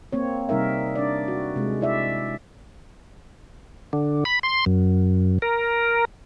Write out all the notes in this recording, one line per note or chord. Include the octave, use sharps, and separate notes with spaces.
A#3 C4 C#5
C3 G3 D#4 A#4 E5
D4 D5
F#4
C3 G#3
E4 D5 E5
D3
B5
C6
F#2
A#4